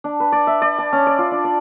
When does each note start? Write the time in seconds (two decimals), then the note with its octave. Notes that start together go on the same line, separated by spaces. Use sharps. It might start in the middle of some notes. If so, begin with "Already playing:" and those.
0.04 D4
0.20 B4
0.32 D5
0.47 E5
0.62 D5
0.78 A5
0.93 C#4
1.07 D5
1.19 F4
1.32 D4
1.44 D5